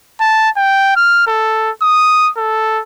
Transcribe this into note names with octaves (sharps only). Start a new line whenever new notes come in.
A5
G5
F6
A4
D#6
A4